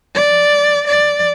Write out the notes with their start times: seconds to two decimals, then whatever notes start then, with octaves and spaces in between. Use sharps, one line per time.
0.15 D5
0.87 D5